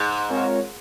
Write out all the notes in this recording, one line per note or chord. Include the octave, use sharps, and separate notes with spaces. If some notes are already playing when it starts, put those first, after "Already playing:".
Already playing: G#2
G#3 C4 F4 A#4 C#5